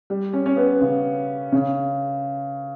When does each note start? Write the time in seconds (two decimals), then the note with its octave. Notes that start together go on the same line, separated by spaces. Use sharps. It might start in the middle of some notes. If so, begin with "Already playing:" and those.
0.10 G3
0.33 C#4
0.46 C#4
0.57 B3
0.81 C#3
1.52 C#3